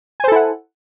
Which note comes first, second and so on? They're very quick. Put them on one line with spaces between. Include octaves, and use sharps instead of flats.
G#5 C5 A4 E4 F#5